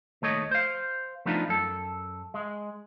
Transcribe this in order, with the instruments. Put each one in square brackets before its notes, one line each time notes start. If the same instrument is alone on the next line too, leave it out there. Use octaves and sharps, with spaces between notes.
[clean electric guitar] D#2 A3 C#5 D#5
C5 F5
F3 A3 B3 D4 D#4 F4
F#2 A4
G#3